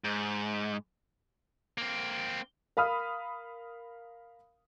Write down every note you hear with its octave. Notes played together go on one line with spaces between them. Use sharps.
G#2
A#3 C4
A#4 F5 B5 D#6 F6